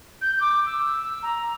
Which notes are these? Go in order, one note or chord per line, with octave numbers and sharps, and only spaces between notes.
G6
D6
E6
A#5